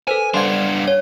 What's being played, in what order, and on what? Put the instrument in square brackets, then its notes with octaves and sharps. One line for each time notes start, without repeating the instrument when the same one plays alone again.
[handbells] A4 B4 C5 [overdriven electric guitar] G#5
[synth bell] G3 F5 G#6 [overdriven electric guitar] B3 D4 [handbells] C6
[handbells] C#5